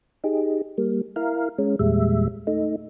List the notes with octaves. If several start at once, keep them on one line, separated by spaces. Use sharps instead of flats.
D#4 G4 G#4
G3 A#3
E4 A#4 F5
G#3 C#4
E2 A#2 G3 G#3 E5
A3 D#4